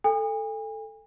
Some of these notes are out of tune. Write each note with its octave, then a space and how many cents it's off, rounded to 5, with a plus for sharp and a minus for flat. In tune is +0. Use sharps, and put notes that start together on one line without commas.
A4 +0 G#5 -40